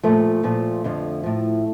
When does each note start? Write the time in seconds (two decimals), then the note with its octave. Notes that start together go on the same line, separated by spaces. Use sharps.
0.03 A#2 F3 A3
0.44 A#2 F3
0.84 F2 D3 F3
1.24 A2 F3